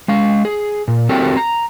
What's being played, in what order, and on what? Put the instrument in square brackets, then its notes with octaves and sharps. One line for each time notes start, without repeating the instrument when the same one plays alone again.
[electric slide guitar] G#3 F5
G#4
A#2
C4 F#4 G4 A4 A#4
A#5